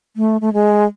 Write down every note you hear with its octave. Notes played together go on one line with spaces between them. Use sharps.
A3
A3
G#3